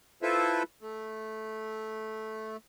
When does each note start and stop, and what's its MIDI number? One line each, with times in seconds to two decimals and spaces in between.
0.22 0.63 64
0.22 0.63 65
0.22 0.63 69
0.22 0.63 71
0.22 0.63 72
0.22 0.63 76
0.81 2.57 57